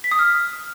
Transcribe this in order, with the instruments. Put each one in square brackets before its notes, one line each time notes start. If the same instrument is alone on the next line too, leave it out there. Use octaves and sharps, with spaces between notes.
[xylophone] B6
D#6
F6